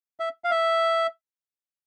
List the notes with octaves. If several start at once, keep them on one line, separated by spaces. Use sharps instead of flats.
E5
F5
E5